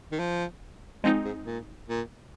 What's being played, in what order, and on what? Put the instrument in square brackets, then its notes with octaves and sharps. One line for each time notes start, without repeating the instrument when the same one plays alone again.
[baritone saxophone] D#3
F3
[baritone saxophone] F3 [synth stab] G#3 C4 D#4
[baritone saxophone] G#2
A#2
A#2